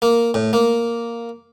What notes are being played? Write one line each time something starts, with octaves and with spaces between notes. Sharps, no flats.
A#3
A2
A#3